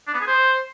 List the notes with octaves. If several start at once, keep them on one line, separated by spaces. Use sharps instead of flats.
D4
B3
G#4
C5